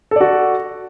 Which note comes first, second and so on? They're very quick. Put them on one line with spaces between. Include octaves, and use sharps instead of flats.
A4 D5 F#4